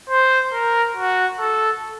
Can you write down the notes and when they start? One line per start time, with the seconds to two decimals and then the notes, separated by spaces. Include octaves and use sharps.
0.10 C5
0.53 A#4
0.96 F#4
1.40 A4